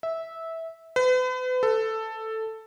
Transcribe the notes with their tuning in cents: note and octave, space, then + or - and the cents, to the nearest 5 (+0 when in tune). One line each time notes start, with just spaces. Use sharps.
E5 -15
B4 +40
A4 +5